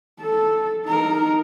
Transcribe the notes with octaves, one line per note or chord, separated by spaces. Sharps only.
A4
D#4 A#4